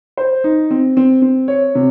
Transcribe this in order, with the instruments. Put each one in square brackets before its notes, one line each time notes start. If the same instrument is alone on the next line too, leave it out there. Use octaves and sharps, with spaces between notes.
[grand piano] C5
D#4
C4
C4
C4
C#5
C3